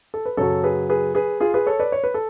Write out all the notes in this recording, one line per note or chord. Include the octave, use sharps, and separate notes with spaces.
A4
B4
F#2 C#3 F#3 A4 C#5
G#4 B4
G#4 B4
G#4 B4
F4 G#4
G#4 B4
A4 C#5
B4 D5
C#5
B4
A4